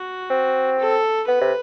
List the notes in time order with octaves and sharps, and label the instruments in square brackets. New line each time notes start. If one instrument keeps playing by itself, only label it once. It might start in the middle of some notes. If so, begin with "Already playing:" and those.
Already playing: [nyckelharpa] F#4
[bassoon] C4
[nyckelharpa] A4
[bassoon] B3 [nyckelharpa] B4
[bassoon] C3